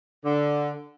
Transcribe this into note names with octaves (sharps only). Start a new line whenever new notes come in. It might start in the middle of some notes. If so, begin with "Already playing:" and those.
D3